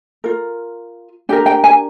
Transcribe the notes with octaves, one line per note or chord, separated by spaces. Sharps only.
F4 A#4
D4 G4 A#4 G5
G5
G#5